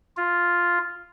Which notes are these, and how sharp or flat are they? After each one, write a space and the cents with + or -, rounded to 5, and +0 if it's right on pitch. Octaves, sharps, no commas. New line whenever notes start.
F4 +0